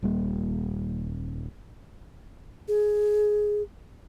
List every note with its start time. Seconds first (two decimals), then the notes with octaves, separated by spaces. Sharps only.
0.03 D#1 G3 A#3
2.68 G#4